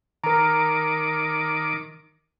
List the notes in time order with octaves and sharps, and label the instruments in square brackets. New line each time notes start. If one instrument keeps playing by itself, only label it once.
[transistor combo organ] D#3 D6 [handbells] A#4 A#5